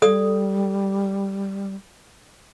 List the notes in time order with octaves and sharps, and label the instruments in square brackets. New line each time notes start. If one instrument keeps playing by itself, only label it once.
[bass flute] G3 [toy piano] A4 D5 D#6